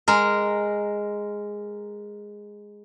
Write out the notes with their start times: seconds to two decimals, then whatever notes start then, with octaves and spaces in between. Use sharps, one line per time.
0.08 G#3 A#4